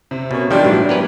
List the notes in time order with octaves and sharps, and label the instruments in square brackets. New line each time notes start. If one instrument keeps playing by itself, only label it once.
[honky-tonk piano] C3
[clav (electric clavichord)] B2 [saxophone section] A#3 C#4
[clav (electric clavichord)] D#3 F3 G3 [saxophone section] D4 [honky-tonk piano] G4 C5
[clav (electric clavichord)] A2 E3 G3 [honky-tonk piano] F#3
[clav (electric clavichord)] B3 A#4 B4 [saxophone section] C#4 G4